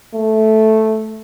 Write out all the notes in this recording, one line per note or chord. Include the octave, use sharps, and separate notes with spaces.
A3